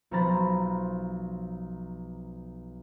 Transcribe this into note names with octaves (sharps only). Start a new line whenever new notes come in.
B1 F3 C5 A#5 B5 A6